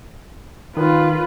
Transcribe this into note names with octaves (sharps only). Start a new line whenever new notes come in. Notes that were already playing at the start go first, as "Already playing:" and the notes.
D#3 F4 B4